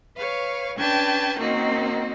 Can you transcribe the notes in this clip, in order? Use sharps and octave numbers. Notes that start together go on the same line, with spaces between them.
B4 C#5 F5
C#4 D4 B4 G5 A5 G#6
D#3 A#3 C4 C#4 D#4 F#4